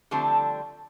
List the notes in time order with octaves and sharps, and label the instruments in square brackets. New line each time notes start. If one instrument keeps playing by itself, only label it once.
[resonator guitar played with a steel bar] D3 F3 G3 A3 C4 D4